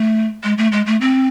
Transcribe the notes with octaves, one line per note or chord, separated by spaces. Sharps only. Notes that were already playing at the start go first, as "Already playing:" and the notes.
Already playing: A3
G#3
A3
G#3
A3
C4